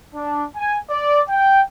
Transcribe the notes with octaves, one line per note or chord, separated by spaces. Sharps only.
D4
G#5
D5
G5